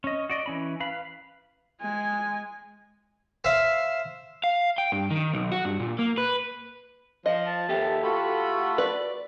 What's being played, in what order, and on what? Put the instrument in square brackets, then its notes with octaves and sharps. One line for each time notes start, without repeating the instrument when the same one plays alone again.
[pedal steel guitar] C#4 D#5
F#4 D5 D#5
E3 C#4 B5
B4 F5 B5
[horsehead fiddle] G#3 G#5
[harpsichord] C5 E5 F5
[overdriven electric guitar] F5
G5
G2
D#3
B1
F#4
G2
A#2
A#3
B4
[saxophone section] F3 [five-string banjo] D#5
[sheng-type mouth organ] A5
[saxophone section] D#2 E5 [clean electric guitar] G4 A4
[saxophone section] A3 F#4 [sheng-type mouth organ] F4 B5
[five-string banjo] B4 [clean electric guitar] D5